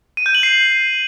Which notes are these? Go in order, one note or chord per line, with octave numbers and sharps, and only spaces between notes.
D#7
G6
F#7
C7